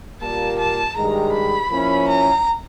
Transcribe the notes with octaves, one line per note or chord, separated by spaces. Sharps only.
A#2 G3 A#3 A5
A5
G2 D#3 G#3 A#5
B5
F3 A#3 C#4 E4
A#5